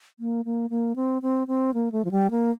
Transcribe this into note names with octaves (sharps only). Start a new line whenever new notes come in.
A#3
A#3
A#3
C4
C4
C4
A#3
A3
F3
G3
A#3